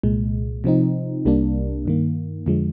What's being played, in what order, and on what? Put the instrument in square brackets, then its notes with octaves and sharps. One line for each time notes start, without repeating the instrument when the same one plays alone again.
[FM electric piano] C2 A#2 G#3
C3 F3 C4 D#4
C2 C3 G3 A#3 D4
G2 D#3 A#3
F2 D3 F3 G#3